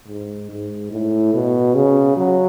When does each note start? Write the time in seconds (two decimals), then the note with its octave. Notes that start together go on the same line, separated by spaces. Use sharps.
0.08 G#2
0.50 G#2
0.92 A2
1.34 B2
1.75 C#3
2.17 F#3